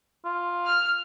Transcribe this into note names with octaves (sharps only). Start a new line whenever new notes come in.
F4
F6